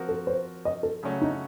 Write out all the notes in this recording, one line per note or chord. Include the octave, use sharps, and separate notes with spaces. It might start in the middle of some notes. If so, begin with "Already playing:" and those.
Already playing: F3 C4 F#4 A#4
A4
C5
D#5
A4
C#3 F#3 A3 C#4 F#4
D#4